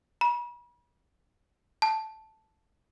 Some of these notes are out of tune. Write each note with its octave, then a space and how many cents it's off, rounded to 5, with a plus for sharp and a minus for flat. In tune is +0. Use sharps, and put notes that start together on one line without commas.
B5 -40
A5 -5